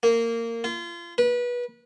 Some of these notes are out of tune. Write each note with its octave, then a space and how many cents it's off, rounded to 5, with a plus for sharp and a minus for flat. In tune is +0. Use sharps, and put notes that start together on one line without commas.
A#3 -15
F4 -30
B4 -25